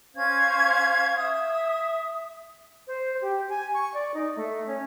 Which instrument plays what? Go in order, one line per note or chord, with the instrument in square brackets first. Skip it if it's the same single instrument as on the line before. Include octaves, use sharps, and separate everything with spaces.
[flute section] C#4 C5 F5 G#6
E5 D#6
[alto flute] C5
G4
G#5
C#6
D5
D#4
A3
C#4